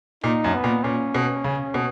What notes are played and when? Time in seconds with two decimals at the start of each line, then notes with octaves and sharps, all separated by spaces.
0.24 A#2 D#4
0.44 F#2
0.54 B3
0.64 A#2
0.83 A#2 C#4
1.15 B2
1.44 C#3
1.74 B2